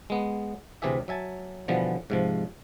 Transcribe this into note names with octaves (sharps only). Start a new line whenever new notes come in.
G#3 B3
D2 C3 E3 G4 G#4 E5
F#3 E5 G#5 A5
B2 D3 E3 F3 G3 B3
G#2 C3 F3